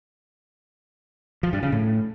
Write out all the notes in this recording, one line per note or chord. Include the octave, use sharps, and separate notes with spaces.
F3
G2
C#3
A2